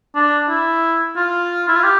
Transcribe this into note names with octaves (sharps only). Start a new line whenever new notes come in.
D4
E4
F4
E4
F4
G4